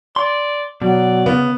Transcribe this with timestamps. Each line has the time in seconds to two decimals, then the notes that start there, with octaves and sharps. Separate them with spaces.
0.16 D5 C6
0.82 B2 F#3 D5
1.26 C#3 B3